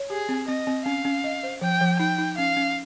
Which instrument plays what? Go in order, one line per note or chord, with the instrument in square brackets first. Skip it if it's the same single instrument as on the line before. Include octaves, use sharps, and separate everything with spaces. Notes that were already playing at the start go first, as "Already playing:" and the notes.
Already playing: [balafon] C#5
[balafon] G4 [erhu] G#4
[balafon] C4
[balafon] C4 [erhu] D#5
[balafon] C4
[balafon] C#4 [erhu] F5
[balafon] C#4
D#5
C5
[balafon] F3 [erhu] G5
[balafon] F3
[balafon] D#4 [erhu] G5
[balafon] D#4
[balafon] C#4 [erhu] F5
[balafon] C#4